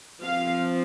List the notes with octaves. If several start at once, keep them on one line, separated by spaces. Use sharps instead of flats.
F3 C4 F5